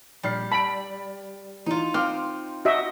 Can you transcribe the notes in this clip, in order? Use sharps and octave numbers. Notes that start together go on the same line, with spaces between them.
A#1 G3 F6 C7
A5 B5 D7
E3 D#4 F4
C4 F5 C6 D6 F6
F#4 D#5 E5